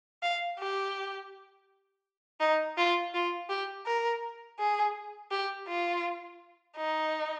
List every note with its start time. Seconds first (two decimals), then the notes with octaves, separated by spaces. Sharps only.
0.22 F5
0.59 G4
2.40 D#4
2.77 F4
3.14 F4
3.49 G4
3.86 A#4
4.59 G#4
5.31 G4
5.68 F4
6.77 D#4